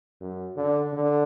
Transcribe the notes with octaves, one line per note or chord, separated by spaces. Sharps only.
F#2
D3
D3